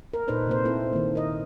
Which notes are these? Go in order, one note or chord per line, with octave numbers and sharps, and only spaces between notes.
A#4
A#2 D#4 A4 B4 C5 D5
C3 A#3 C5
C4 E4 A4
D#3 A#3
A#4 D#5